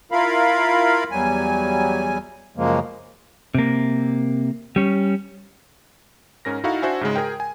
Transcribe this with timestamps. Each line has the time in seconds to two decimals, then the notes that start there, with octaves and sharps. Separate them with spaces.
0.12 E4 F4 A#4 F5 B5
1.11 E2 F#3 G3 G#5
2.57 F#2 C#3 F3 G#3 A#3
3.54 C3 A#3
4.76 G3 C#4
6.45 G#2 C#4 A#4 A#6
6.64 D#4 E4 F#4 A4 F5
6.82 D4 F#4 C5 E5 G#5
7.01 G#2 C#3 G#3
7.16 G#4 A#4 G5
7.40 G#5